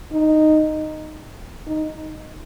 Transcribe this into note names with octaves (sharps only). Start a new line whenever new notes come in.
D#4
D#4